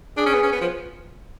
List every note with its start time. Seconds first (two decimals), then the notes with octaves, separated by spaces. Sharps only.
0.17 D4 G#4
0.26 C#4
0.34 B3
0.43 C#4
0.52 B3
0.61 F3